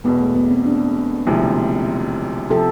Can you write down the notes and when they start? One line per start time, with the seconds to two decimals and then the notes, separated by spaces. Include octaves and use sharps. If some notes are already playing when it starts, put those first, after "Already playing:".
0.04 E1 E2 B2 B3
0.20 A3
0.36 B3
0.51 C4
0.66 D4
1.27 E1 D2 C3 F3 E4
2.50 C3 F3 A4